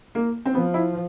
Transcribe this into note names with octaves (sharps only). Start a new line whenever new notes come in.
A#3
C4
F3 B3
E4